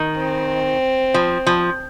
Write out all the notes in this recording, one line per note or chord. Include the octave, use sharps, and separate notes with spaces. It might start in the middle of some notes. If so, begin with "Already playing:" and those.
Already playing: D#3
C4
F3
F3